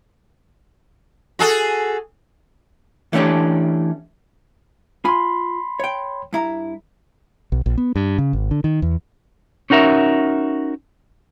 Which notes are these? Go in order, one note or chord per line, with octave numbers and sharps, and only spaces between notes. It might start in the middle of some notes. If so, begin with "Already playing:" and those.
F#4 G#4 A4
E3 A3 C#4 D4 G4
F4 G#5 B5 C6
C#5 G5
G2 E4 A#5
B1
A#1
B3
G2
C#3
G#1
D3
D#3
E2
C#4 D#4 F#4 A#4 E5